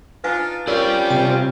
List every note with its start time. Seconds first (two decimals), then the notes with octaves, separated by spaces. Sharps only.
0.24 D4 D#4 F4 B4 F5 G#5
0.68 C4 C#4 F4 G4 A#4 D5
1.10 C3 G5